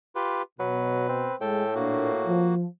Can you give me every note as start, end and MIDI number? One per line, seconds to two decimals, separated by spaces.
0.16 0.42 65
0.16 0.42 67
0.16 0.42 71
0.59 1.27 47
0.59 1.08 54
0.59 1.36 71
1.09 1.34 60
1.41 2.45 45
1.41 1.65 56
1.41 1.65 68
1.41 1.74 69
1.41 1.74 79
1.75 2.10 46
1.75 2.55 58
1.75 2.10 62
1.75 2.55 66
2.26 2.65 53